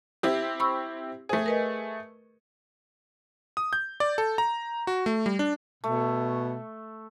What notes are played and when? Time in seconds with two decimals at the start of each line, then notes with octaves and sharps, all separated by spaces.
0.23 C4 E4 G4
0.60 B5 C#6 E6
1.29 A3 G#4 C5
1.46 A#4 B4 D#5
3.57 D#6
3.73 G6
4.00 D5
4.18 A4
4.38 A#5
4.87 F#4
5.06 A3
5.26 G3
5.39 D4
5.84 B2 A3